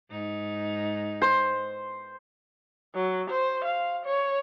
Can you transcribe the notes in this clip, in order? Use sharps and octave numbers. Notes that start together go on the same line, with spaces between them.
G#2 D#4
C5
F#3
C5
F5
C#5